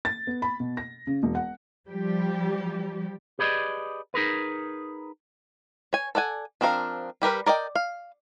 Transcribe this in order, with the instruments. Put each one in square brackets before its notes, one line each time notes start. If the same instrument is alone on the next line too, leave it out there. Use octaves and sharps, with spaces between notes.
[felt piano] A6
B3
B5
B2
A#6
C#3
E1
F#5
[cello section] F3 G3 G4
[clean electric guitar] G4 G#4 B4 D5 D#5
D#4 G#4 A#4 B4
[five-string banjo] C#5 G#5
A4 D5 F#5 G#5
F3 C4 D4 A#4 F5
G3 G4 A#4 B4
A#4 D5 D#5 G5
F5